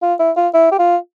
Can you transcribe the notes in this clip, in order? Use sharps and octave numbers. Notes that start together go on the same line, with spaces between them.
F4
E4
F4
E4
G4
F4